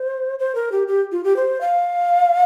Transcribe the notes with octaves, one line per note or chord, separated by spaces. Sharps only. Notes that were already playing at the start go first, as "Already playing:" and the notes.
Already playing: C5
C5
A#4
G4
G4
F4
G4
C5
F5